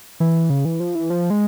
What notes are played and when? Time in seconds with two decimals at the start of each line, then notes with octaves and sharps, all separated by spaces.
0.20 E3
0.50 C#3
0.65 E3
0.80 F3
0.95 E3
1.10 F3
1.30 G#3